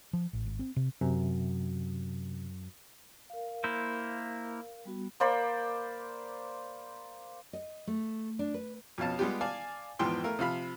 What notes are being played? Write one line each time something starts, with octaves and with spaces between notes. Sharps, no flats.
F3
A1
G#1
C4
C3
F#2 C3
A#4 F5
A#3 E4 C5
G3 B3 F#4
A#3 C5 D5 B5
D#5
A3
D4
B4
F2 B2 C#4 F5 A5
G3 G#3 B3 F4 G4
D5 F5 G#5 A5
E2 G#2 F3 B3 G5 C6
A3 E4 A#4 F5
C3 F3 F5 B5